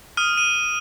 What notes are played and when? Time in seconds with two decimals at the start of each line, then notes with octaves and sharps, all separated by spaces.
0.17 D#6 F6 D#7
0.38 D#7